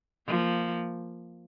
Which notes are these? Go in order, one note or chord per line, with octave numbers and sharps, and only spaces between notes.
F3 A#3